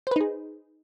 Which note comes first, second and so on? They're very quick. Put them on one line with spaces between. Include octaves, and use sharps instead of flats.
C5 B4 D#4 G#4